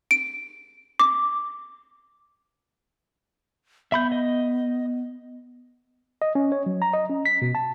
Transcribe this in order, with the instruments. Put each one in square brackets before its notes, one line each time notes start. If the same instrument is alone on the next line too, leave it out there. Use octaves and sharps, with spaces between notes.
[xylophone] D7
D6
[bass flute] B3 [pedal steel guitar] E5 B5 G6
[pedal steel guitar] D#5
[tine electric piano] D#5
C#4
C#5
F#3
A#5
D#5
C#4
B6
B2
A5